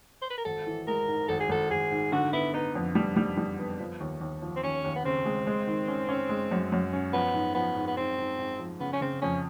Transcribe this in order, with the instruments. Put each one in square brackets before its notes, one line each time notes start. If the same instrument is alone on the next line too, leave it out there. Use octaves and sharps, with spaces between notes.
[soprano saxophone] C5
B4
A#4
[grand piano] G#1 [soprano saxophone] A4
[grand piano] E3
[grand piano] G#3 [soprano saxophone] A#4
[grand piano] G#2
[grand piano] G#1 [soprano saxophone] A4
[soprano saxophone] G#4
[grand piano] G#1 [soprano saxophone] A4
[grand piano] G#1 [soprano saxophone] G#4
[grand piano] G#2
[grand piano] D3 [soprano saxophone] F#4
[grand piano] B3 [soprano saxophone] E4
[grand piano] B3 [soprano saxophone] D#4
[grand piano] F2
G3
G3
G3
B3
F3
D#2
D#2
F3
[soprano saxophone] C4
[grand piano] D#2 [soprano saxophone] C#4
[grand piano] D#2
[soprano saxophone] B3
[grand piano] C#3 [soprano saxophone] C4
[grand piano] G#3
G#3
D#3
C#4
C#4
G#3
F#2
F#2
C#4
[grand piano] F3 [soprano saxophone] B3
[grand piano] G#2
[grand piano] F3 [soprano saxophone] B3
[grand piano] G#2
[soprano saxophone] B3
[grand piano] G#2 [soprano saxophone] C4
[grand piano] G#2
G#2
F3
[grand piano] C#3 [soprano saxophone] B3
[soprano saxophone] C#4
[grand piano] C#3 [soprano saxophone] C4
[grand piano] F2 [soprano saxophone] C#4